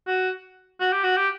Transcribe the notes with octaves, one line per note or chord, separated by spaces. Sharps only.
F#4
F#4
G4
F#4
G4